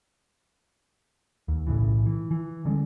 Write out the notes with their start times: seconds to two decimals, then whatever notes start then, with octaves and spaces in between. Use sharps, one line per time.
1.48 D#2
1.67 B1 A2 C#3 E3
2.06 E3
2.31 E3
2.65 D3 G3 G#3 C#4